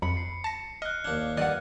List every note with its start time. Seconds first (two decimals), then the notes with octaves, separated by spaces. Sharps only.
0.02 F2 B5 C#7
0.17 C7
0.44 A5 A#6
0.82 D#5 F6 F#6
1.05 D#2 D4 F6 F#6 G#6
1.37 G2 D#3 D5 D#5 F#5